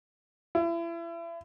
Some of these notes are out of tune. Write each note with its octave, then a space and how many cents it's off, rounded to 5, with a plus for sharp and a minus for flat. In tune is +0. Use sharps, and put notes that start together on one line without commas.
E4 +35